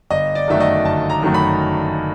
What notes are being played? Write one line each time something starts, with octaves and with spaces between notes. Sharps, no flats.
G1 D#5
D5
F#2 D#3 F#3 A3 E5
D#5
G1 A5
A#5
F#2 D#3 F#3 A3
B5